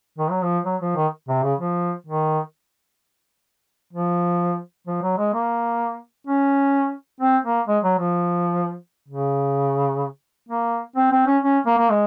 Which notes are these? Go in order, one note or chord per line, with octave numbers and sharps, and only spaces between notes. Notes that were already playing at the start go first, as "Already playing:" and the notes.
D#3
F#3
F3
F#3
F3
D#3
C3
C#3
F3
D#3
F3
F3
F#3
G#3
A#3
C#4
C4
A#3
G#3
F#3
F3
C#3
A#3
C4
C4
C#4
C#4
A#3
A#3
G#3